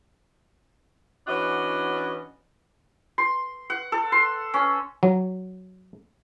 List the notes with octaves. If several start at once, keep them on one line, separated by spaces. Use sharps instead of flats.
E3 B3 C#4 D4 F#4 D#5
C6
F#5
A4
C6
C#4
F#3